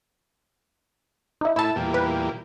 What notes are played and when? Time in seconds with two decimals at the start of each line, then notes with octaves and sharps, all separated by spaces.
1.41 D#4 E4
1.56 A2 E4 E5 A5
1.76 E2 A#2 G3
1.94 B4